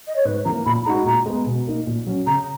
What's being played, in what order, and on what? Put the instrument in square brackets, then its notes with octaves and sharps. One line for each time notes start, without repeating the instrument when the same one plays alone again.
[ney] D#5
C#5
[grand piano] G#2 [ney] B4
[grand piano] E3 A#3 [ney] A#5
[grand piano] A#2 [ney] B5
[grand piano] G#3 D#4 F#4 [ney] A#5
[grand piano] A#2 [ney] A#5
[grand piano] G#3 B3
B2
A#3 D#4
A#2
F#3 C#4
[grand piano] C#3 [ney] A#5